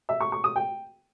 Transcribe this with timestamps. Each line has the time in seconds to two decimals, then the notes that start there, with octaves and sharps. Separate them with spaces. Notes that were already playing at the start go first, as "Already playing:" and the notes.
0.09 E5
0.21 C#6
0.32 C#6
0.44 D#6
0.56 G5